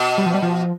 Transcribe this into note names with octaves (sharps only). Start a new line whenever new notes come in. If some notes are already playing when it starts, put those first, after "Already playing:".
Already playing: B2
G3
F3
G3
F3